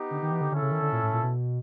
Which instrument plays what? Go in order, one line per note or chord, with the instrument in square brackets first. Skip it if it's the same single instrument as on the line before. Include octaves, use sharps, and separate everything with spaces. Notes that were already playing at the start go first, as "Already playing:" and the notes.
Already playing: [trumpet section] B3 D#4 G4
[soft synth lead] D3
D#3
E3
D3
[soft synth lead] D3 [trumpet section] C#4 E4 A4
[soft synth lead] C#3
D#3
D3
A#2
A2
A#2
B2